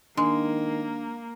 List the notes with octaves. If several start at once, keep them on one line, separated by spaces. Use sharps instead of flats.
D#3 G#3 A#3 D4